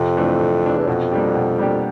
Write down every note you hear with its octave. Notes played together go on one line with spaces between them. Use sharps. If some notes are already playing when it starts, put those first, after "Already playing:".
Already playing: F2 C3
E3 A3 D4
C3
E3 A3 D4
E2
F2 B2
G3 A#3 D4 G4
B2
G3 A#3 D4 G4